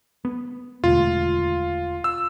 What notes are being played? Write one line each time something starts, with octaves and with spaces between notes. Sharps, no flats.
B3
E1 D2 F4
E6